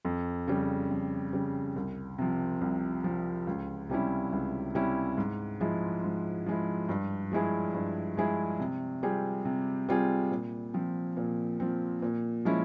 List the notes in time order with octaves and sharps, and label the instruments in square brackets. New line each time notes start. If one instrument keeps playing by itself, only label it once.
[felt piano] F2
C#3 G3
F2
C#3 G3
C2
C3 F3
C2
C3 F3
C#2
C3 G3 C#4 E4
C#2
C3 G3 C#4 E4
G#2
F3 G#3 E4
G#2
F3 G#3 E4
G2
F3 G#3 E4 G#4
G2
F3 G#3 E4 G#4
C3
G3 C4 F4 G#4
C3
G3 C4 F4 G#4
A#2
F3 C4
A#2
F3 C4
A#2
F3 G#3 C#4 E4